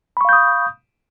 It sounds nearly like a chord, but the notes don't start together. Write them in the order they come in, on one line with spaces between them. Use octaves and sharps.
B5 C#6 F5 G6 D#6